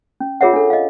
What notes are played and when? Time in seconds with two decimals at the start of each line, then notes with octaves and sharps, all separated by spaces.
0.20 C#4
0.41 F4 G#4 A#4 C#5 E5 F#5
0.53 D4 A4
0.70 D#5 F5